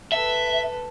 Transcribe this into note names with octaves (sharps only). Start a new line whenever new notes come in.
A4 B4 E5